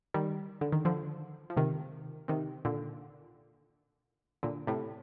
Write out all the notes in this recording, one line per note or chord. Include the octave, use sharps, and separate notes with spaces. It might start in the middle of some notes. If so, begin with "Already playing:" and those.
D#3 G3
D3
D#3
D3 F3
F3
C3 D#3
C3 D#3
A#2 D3
A#2 D3
A2 C3